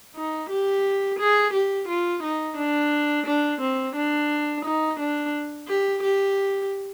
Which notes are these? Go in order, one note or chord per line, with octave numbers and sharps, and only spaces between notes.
D#4
G4
G#4
G4
F4
D#4
D4
D4
C4
D4
D#4
D4
G4
G4